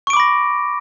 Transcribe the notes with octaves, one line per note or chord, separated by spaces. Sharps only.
B5 C#6 D6 A#6 D7